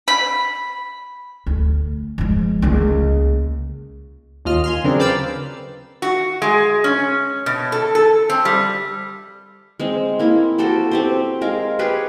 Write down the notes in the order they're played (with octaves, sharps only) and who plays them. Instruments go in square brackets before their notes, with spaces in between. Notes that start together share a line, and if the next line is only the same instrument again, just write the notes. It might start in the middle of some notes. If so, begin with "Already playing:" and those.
[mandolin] B5
[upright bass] D2
F3 G#3
C#2 A#3
[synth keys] D#2 F4 D#5 F6
G#5 C6 F6
C#3 F#3 C4 D4 A#4
B4 D5 F5 G5 E6
[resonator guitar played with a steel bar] F#4
G#3
C#4
B2
A4
A4
C4
G3
[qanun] G#3 C4
A#3 E4
F#4 G4 A4 C5
C4 G4 C5
G#3 A#4 F5
G4 G#4 B4 C#5